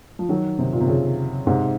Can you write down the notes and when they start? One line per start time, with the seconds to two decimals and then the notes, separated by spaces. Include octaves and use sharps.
0.19 F3
0.29 D#3 F#3
0.59 C3 D#3
0.73 A#2
0.81 C3
0.88 A#2 C#3
1.47 G#2 C3